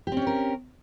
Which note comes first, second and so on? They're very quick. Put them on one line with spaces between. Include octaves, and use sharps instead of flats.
G4 C4 C#4 C#5 A#4